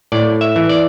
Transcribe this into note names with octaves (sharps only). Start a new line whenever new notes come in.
A2 D5
E5
E3
D5